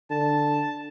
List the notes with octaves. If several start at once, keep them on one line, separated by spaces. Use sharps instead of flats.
D3 A5